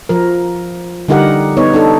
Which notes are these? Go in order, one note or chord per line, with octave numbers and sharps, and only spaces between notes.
F3 A#4
D3 G3 D#4 G4 A#4 F#5
B3 D#4 C#5
D4 D#4 A4